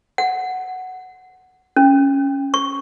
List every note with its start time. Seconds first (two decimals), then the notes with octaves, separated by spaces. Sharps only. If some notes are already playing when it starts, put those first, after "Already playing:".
0.18 F#5
1.76 C#4
2.54 C#6